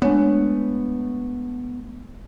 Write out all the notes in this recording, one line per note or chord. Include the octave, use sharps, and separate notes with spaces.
G#3 A3 B3 D4 C#5